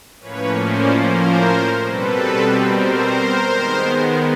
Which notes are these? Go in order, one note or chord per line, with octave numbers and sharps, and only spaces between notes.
A2 F3 A#3 C#4 B4 C#5
C5 D5
A#4 C5
B2 G3 C4 A4 B4
A#4 C5
D#3 G#3 B3